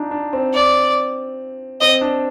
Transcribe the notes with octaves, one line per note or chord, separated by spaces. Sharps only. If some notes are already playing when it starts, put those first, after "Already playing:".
Already playing: D4 D#4 F4
D4
C4
D5
C4 D#5
D4